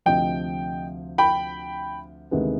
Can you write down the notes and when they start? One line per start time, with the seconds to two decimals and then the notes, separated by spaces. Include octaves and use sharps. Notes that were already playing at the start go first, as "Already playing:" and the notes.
0.06 D2 C3 F3 D#5 G5
1.18 G5 B5
2.31 D2 C3 D#3 G#3 B3